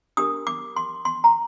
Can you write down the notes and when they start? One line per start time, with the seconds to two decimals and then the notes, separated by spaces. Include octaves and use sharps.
0.17 D4 G4 A#4 D#6
0.47 D6
0.76 C6
1.05 C6
1.24 A#5